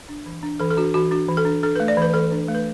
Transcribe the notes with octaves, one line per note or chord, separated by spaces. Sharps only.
D4
E3
D4
E3 A4
A4
D4 F#4
E3 F#4
D4 F#4
E3
A4
D4
D4 A4
B4
A3
D5
E3 B4
E3 A4
D4
A3
B4